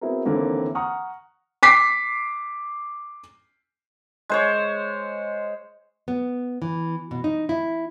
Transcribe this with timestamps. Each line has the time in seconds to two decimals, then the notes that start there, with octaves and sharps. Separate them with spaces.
0.01 B3 C4 E4 F#4 G#4 A#4
0.25 D#2 D3 E3 A#3 C4
0.75 F#5 A#5 C#6 D#6 F6
1.63 D6 B6 C7
4.29 G#3 C5 C#5
6.08 B3
6.62 E3
7.11 B2
7.24 D#4
7.49 E4